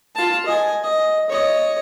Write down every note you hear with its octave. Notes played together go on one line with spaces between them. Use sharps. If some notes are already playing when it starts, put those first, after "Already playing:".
F4 A5
D#5 G#5
D#5
C#5 D#5